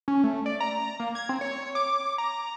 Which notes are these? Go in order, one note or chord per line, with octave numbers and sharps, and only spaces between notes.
C#4
A3
D5
A#5
A#3
G#6
C4
C#5
D6
A#5